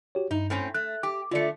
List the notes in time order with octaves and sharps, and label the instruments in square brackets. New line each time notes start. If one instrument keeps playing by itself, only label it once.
[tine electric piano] F#4 G4 C#5
[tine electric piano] G2 [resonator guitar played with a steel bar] D#4
[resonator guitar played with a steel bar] A2 C4 C#4
[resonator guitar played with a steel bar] A3 [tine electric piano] F#6
[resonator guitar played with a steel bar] G4 [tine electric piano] D6
[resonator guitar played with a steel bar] D3 A3 [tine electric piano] F4 D5 C#7